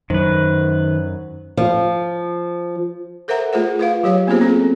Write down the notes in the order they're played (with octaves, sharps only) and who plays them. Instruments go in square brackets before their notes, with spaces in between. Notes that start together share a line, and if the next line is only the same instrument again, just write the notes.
[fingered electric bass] F#2 [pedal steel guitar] D#3 B4 [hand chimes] C5
[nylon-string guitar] F3
[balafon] A4 A#4 C5 E5 F#5 A#5
A3 F4 G#4 C5 F#5
F4 B4 F5
F#3 G4 C#5 F5
A#3 B3 C#4 F4 G#4 C5
C4 C#4 F#4 A4